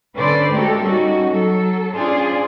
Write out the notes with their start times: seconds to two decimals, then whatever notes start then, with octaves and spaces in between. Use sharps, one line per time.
0.17 D3 C#4 B4 C5 D5
0.53 G#3 A3 F#4 G4 A4 A#4
0.83 G3 C#4 D#4 F#4
1.29 F#3 A4
1.95 C#4 D4 F4 G#4 C5 D5